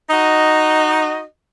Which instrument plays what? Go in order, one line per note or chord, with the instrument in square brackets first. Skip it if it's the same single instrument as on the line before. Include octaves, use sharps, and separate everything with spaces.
[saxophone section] D#4 F#4 D#5